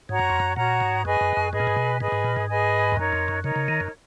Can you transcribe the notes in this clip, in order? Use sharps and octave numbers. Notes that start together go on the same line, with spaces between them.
G#2 F#4 C#5 F#5 A#5
F#2
F2
F#2
A#2 F#4 C#5 F#5 A#5
G#2
F#2 G#4 B4 D#5 G#5
F#2
F#2
G#2 G#4 B4 D#5 G#5
A#2
G#2
B2
G#2 G#4 B4 D#5 G#5
G#2
A#2
G#2
G#4 B4 D#5 G#5
F2
F#2 D#4 A#4 C#5
F2
F#2
C#3 D#4 A#4 C#5
C#3
D#3
F#2